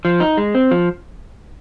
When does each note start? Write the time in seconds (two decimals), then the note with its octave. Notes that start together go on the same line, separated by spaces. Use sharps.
0.05 F3
0.20 D#4
0.37 G#3
0.55 C4
0.71 F3